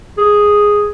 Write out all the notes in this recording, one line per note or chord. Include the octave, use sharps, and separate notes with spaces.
G#4